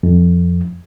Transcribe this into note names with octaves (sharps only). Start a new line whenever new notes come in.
F2